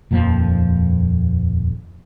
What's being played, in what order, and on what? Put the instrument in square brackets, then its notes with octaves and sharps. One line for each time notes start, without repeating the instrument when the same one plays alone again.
[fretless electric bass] D#1 F2 F3 A#3